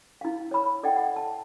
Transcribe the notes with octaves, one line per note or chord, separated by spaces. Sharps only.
E4 F5
C#5 B5
A4 D5 D#5 F#5 G5
F#5
A5